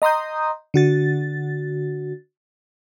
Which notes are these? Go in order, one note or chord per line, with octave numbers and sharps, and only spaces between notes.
D#5 A#5 C6 D#6 G6
D3 F#4 A6